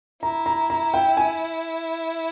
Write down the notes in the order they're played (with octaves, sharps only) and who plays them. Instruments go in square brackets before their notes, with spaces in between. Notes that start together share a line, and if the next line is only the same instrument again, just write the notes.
[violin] E4 [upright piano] A#5
[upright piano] A#5
A#5
G5
G#5